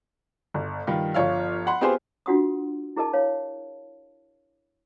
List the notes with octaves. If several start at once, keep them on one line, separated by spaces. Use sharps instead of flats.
G1
G2 D#3 F4
G1 F3 C#5 F5 F6
F#5 B5 C6
B3 C4 F4 G4 G#4 C5
D4 F4 F#4 F#5 C6 D#6
E4 G#4 A#4 D#5 A5
C#5 F5